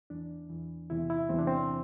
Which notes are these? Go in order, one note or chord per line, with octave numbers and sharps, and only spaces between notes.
E2 E3 D4
E2 E3
E2 C3 E3 E4
E4
E2 C3 E3 C4
D4
C4